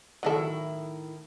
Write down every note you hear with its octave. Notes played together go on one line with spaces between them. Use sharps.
A2 D#3 F#3 E4 A4